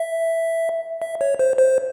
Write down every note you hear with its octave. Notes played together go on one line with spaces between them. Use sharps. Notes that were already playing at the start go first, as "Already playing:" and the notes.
Already playing: E5
E5
C#5
C5
C5